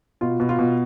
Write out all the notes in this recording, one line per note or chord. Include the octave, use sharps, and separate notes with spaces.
B2 F4
B2
F4
B2